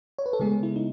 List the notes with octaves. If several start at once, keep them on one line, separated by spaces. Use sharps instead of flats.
C#5
B4
A4
C#3 G#3 B3 G#4
E4
D#4